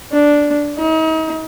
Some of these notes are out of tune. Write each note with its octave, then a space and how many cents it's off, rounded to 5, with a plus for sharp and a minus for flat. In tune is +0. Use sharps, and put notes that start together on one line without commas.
D4 -5
D#4 +40